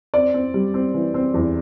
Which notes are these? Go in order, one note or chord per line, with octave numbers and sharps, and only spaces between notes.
C4 D5
C4
G3
C4
E3
C4
E2